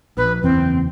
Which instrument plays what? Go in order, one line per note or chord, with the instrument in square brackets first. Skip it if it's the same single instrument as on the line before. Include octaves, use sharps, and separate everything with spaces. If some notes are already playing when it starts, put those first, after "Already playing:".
[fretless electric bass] A#1 [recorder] B4
[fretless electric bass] F#1 E2 E3 [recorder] C4